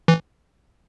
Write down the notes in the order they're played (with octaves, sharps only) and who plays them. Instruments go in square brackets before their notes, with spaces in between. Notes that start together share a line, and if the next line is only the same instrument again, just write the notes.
[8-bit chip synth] E3